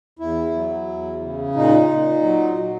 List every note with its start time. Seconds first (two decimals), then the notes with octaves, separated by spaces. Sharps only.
0.19 E2 E4
0.53 F#3
0.87 E2
1.21 C#3
1.55 A#2 D#4
1.89 A#2
2.22 F#3
2.57 F#3